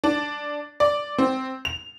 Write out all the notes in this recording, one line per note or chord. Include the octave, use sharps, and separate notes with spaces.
D4
D5
C4
F7